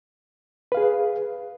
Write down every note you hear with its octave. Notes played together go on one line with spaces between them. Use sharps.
G#4 B4 F5